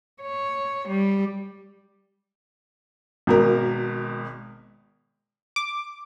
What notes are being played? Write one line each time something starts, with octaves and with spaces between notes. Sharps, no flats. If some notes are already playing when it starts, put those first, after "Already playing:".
C#5
G3
G#1 B2 A#4
D6